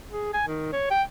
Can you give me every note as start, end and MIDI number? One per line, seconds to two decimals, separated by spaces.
0.12 0.29 68
0.34 0.43 80
0.48 0.71 51
0.73 0.88 73
0.91 1.02 79